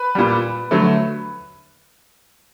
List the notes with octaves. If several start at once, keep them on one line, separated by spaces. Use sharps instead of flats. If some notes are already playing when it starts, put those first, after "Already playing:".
Already playing: B4
A#2 G3
D3 F#3 A3